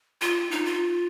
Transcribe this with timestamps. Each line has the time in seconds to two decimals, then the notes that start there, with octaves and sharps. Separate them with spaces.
0.22 F4
0.51 D#4
0.66 F4